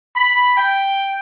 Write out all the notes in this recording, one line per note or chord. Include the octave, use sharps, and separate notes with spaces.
B5
G5